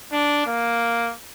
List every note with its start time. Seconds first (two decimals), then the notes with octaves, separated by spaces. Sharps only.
0.13 D4
0.47 A#3